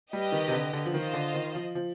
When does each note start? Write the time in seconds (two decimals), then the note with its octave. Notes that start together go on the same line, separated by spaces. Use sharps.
0.13 G3 G4 B4 D#5
0.32 D#3
0.48 C3
0.53 D3
0.73 D3
0.86 F3
0.94 D#3 F4 C5 D#5
1.13 D3
1.34 D#3
1.55 F3
1.75 F3